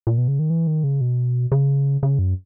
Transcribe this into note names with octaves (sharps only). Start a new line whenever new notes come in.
A#2
B2
C#3
D#3
E3
D#3
C#3
B2
C#3
C#3
F#2